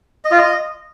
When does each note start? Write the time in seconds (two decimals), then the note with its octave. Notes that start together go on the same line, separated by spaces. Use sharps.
0.25 D#5
0.31 F4
0.38 D#5